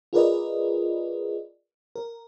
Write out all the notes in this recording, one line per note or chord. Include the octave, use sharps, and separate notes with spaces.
F4 G#4 A#4 B4 D5 D#5
A#4